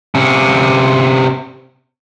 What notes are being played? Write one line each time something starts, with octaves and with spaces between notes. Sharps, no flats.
C3 C#4